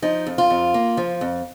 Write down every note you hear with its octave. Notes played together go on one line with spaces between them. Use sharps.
F3 D#4
F2
F4
F2
A#3
F3
F2